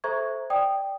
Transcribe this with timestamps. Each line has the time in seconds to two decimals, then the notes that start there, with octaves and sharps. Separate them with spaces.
0.04 A4 C5 E5 A#5 C#6 G#6
0.50 D5 G5 D#6